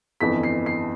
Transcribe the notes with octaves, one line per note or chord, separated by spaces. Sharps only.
G1 F2 E3 B6
C7
C7